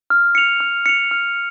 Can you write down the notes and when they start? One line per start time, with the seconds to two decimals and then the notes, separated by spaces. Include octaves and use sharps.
0.10 F6
0.35 C#7 F7
0.60 F6
0.86 C#7 F7
1.11 F6